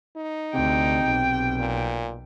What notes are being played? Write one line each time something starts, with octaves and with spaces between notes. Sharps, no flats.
D#4
D2 C3 G5
B1
A#2